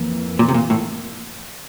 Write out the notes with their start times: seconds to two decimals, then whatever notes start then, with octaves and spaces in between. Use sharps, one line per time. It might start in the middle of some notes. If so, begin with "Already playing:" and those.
Already playing: F2 E3 A#3
0.39 A#2
0.49 C3
0.54 A#2
0.70 A2